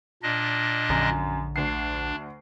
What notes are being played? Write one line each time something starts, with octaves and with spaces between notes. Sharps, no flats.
A#2 D4 D#5
A#1 F#2 D3
D2 D4 C7